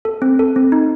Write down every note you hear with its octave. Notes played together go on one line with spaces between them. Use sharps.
A4
C4
A4
C4
D#4